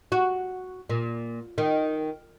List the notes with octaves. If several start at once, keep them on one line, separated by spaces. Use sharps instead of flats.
F#4
A#2
D#3